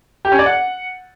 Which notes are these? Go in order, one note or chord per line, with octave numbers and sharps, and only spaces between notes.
G4
C#4
D5
F#5